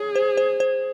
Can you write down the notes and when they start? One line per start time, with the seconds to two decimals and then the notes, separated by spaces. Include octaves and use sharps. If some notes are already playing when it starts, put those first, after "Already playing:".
Already playing: G#4 C#5
0.15 C5
0.37 C5
0.60 C5